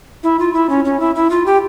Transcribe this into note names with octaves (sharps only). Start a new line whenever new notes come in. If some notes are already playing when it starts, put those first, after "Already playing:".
E4
F4
E4
C#4
C#4
E4
E4
F4
G4